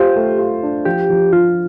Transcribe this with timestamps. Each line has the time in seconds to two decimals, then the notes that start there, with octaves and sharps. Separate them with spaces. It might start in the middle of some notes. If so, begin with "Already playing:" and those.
Already playing: F4 G4 C5
0.16 A3
0.39 F4
0.63 D4
0.85 F3 G4
1.10 F3
1.32 F3 F4